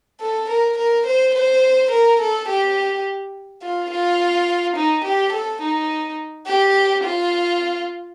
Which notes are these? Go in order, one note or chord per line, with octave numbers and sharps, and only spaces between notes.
A4
A#4
A#4
C5
C5
A#4
A4
G4
F4
F4
D#4
G4
A4
D#4
G4
F4